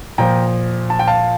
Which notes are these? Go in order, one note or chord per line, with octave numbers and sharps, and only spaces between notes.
A#2 F3 G5 A#5
A5
G5
F5 A5